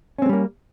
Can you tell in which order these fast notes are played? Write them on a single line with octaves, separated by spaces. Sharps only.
C#4 C4 G#3 G3 A#3